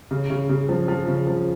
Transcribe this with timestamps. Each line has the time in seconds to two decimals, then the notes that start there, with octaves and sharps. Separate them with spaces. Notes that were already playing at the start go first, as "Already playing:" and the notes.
0.11 C#3
0.30 C#3
0.49 C#3
0.69 F3
0.88 F3
1.08 C#3
1.27 F3